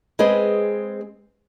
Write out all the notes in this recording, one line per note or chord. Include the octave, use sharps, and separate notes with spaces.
G#3 C4 G#4 B4 D#5